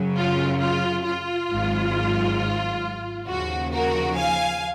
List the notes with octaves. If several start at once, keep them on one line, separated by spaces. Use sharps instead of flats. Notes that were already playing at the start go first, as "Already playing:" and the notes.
Already playing: F#2 C#3 F#3
F4
F4
F4
G#1 G#2 F#3
D#2 C#3 F3 F#4
F#4 A#4
F5 G#5